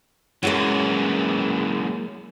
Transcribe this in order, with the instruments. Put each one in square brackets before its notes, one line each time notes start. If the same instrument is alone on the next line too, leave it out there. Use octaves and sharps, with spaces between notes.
[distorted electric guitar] F#2 E3 [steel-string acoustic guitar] F#3 G#3 A#3